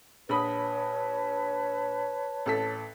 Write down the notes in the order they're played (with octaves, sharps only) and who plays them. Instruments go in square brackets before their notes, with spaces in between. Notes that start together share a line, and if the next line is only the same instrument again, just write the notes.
[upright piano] A#1 B5 D#6 [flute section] B4 C#5 A5
[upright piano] A1 A4 B6